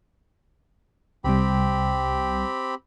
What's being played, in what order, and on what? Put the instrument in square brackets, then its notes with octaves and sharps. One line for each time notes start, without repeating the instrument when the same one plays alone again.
[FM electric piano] C2 C3 G3 [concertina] C4 G4 B5